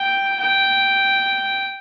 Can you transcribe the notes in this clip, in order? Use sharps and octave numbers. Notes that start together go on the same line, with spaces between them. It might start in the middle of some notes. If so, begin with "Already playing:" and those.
Already playing: G5
G5